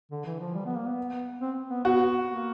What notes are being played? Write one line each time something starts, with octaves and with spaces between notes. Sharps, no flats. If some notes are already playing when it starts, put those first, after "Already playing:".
D3
E3
F3
G3
B3
A#3
B3
C4
B3
B3 F#4
A#3